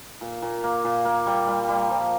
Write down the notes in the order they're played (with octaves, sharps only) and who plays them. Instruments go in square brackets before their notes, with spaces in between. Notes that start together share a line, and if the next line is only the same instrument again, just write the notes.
[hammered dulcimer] A#2
A#2
A#3
A#2
A#3
G3
G3
G3
F3